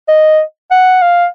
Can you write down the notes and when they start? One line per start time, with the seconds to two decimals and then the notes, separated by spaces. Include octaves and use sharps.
0.08 D#5
0.71 F#5
1.02 F5